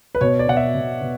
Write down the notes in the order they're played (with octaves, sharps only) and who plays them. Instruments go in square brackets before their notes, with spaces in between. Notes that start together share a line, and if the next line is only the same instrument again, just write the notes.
[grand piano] B4
B2 C#5
D5
B2 F#5
E5
B2
B2